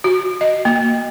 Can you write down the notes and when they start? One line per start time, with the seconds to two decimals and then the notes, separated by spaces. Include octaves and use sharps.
0.04 F#4
0.41 D#5
0.65 A#3